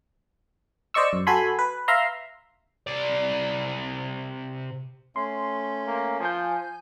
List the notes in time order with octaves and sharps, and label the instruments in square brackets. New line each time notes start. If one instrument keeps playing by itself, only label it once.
[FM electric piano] C5 D5 D#5 C#6 E6
F#2
F#4 A4 G#5 B5 C6
B4
E5 F5 A#5 C6
[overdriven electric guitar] C3 D5
[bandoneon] A3 C#4 [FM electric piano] C6
[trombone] A#3
[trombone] F3 [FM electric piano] G#5 G6